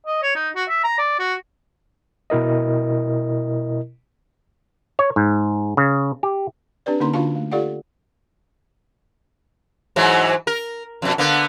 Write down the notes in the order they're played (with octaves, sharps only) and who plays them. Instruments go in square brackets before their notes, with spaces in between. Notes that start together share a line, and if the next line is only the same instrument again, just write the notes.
[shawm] D#5
C#5
D#4
F#4
E5
A#5
D5
F#4
[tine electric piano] B2 E4 A#4 D#5
[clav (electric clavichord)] C#5
G#2
C#3
G4
[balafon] C4 D4 G4 B4 D5
D3 A#3 C#4 D#4 A#5 C6
D3 D4 F4 F#4 F5 A5
A3
F4 G4 A4 D5 F5 F#5
[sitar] G#2 E3 F#3
A#4
F2 B2
D3 A#3 B3